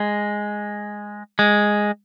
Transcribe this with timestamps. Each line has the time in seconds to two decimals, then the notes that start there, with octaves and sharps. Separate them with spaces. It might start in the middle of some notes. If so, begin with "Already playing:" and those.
Already playing: G#3
1.39 G#3